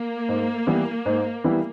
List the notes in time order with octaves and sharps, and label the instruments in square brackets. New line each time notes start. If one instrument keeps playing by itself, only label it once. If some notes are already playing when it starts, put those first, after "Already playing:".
Already playing: [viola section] A#3
[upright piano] G#2
E3 G3 B3 E4
G#2
E3 G3 B3 E4